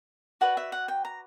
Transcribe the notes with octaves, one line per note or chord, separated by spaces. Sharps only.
F#4 B4 D5 F#5
E5
F#5
G5
A#5